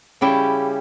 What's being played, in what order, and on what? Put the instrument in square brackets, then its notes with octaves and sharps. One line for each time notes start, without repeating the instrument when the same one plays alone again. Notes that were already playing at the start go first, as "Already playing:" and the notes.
[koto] C#3 G3 C#4 E4 G4